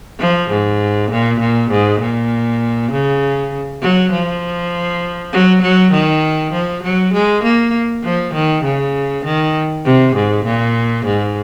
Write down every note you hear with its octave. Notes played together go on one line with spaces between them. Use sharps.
F3
G#2
A#2
A#2
G#2
A#2
C#3
F#3
F3
F#3
F#3
D#3
F3
F#3
G#3
A#3
F3
D#3
C#3
D#3
C3
G#2
A#2
G#2